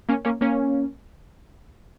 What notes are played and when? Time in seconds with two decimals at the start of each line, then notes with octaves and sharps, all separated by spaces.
0.09 A#3 C#4
0.25 A#3 C#4
0.41 A#3 C#4